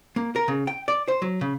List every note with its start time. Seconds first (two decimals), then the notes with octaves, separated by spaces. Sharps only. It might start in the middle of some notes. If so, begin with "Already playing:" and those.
0.16 A#3
0.36 A#4
0.48 C#3
0.67 G5
0.88 D5
1.08 C5
1.22 F#3
1.41 C#3